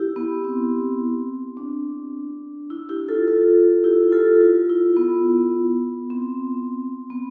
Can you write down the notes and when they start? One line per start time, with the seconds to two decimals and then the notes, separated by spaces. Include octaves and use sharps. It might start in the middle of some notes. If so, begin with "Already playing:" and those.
Already playing: E4 G4
0.16 B3
0.44 C4
1.57 D4
2.70 E4
2.89 E4 G4
3.09 F4 A4
3.27 F4 A4
3.84 E4 G4
4.12 F4 A4
4.41 F4
4.69 E4
4.97 B3
6.10 C4
7.10 B3